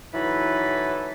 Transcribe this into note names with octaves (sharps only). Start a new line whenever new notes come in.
E3 F#3 D#4 E4 A4 B4